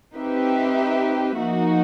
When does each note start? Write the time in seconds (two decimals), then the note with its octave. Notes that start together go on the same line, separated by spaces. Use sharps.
0.14 C4 D#4 G4 B4 E5
1.38 F3 A#3 D#4 F#4